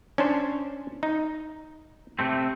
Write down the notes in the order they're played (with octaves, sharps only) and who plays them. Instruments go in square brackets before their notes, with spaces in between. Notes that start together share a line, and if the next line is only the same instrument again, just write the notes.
[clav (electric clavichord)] C#4 D4 C5
D#4
[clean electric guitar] C3 A3 C4